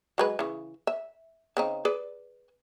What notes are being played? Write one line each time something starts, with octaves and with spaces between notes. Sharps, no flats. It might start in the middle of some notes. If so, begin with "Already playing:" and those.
F#3 G#3 B4
C#3 E3
E5
C#3 C4 D#4
G#4 B4 D5